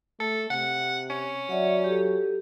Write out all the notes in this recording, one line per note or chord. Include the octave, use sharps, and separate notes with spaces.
A3 A4
C3 F#5
C#4
F#3 D5 E5 F#5
G4 A4